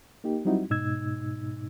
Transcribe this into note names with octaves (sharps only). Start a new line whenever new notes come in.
A#3 D#4 G4
F#3 G3 C4 D#4 E4 F#4
G#2 B2 D#4 E6 G#6